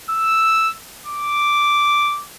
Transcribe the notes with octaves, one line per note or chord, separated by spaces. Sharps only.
E6
D6